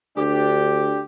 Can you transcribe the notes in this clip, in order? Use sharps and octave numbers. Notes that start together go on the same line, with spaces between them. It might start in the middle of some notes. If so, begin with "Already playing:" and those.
D2 D4 G4